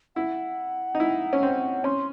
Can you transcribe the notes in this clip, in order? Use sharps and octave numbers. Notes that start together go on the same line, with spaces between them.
E4 F#5
D#4
E4
C#4
C4
C#4 C6